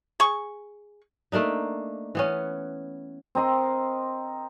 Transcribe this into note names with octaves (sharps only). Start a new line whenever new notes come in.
G#4 C#6
A3 A#3 D4 D#4
E3 B3 C#4
C4 A#4 D#5 C6